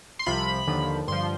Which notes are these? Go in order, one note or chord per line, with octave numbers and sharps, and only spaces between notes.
C6
C2 C3 F3 B5
D#2 D3 F3
G2 D3 F3 C6